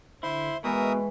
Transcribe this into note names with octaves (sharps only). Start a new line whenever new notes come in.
D3 E4 C5 C6
B2 E3 G#3 A#4 E5 D#6